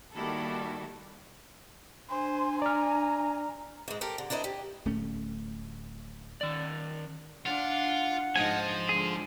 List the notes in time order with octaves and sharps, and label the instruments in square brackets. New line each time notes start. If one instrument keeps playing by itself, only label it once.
[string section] D#3 G3 A4 [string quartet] A#3 E4 F#4
[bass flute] D4 [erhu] C5 [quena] G#5
[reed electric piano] D5 F6 [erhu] A#5
[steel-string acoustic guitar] G#2 G#3
G4 A4 A#4 C5
D3
D4 E4 A#4 C5 D#5
G4
[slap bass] D1 A3 C#4
[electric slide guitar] D#3 D5
[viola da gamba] D4 [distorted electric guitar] F4 [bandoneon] F#5
[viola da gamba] G#2 D#4 D#5 [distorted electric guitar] F3 [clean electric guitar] G#5
[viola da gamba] D3 G#3 [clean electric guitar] G#4